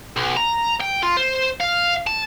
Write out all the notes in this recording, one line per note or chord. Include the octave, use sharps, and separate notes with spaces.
B1
A#5
G5
F4
C5
F5
A5